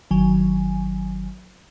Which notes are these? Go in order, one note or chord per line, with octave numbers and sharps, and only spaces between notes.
G1 D#3 F#3 G#5